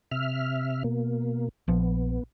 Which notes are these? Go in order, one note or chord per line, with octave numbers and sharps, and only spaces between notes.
C3 E5 F6
B2 A#3
A#1 F3 B3